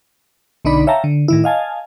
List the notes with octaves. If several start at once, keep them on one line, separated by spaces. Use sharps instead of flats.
B1 D3 D4 D#4 D5 B5
C#5 E5 F5 G5 A5 A#5
D3
A2 D#3 E4
D#5 F5 G#5 A5